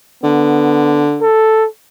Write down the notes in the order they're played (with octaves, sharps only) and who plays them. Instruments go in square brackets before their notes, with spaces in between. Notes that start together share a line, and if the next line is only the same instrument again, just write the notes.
[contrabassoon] D3 [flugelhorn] B3
[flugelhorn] A4